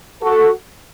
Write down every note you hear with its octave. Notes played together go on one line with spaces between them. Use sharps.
F#4 A4